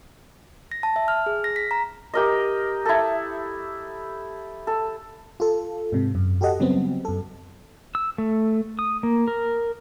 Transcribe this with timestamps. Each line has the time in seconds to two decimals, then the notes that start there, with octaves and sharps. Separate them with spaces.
0.72 A#6
0.83 A5
0.96 E5
1.08 F6
1.26 G#4
1.44 A#6
1.56 B6
1.71 A#5
2.14 G4 A#4 D#5
2.85 E4 A4
4.67 A4
5.40 F4 A4
5.92 G#2 C3
6.15 F#2
6.41 F#4 G4 A4 D#5 F#5
6.60 C#3 F#3 G3 B3 C4
7.05 F#2 A4
7.95 E6
8.18 A3
8.79 D#6
9.03 A#3
9.28 A#4